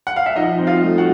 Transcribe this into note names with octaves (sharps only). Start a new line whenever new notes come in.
F#5
F5
E5
F3 D#4 D#5
C4
F4 F5
A3
F#4 F#5